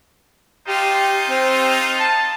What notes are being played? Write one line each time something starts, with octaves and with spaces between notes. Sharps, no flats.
D#4 F4 G4 C5
C4
A5